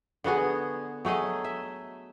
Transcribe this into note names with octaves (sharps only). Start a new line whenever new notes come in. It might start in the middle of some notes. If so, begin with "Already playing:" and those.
D3 B3 F#4 G#4
F#3 A3 G#4 D#5
E5